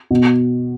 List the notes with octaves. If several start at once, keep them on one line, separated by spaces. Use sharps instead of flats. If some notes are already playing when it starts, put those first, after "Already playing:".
B2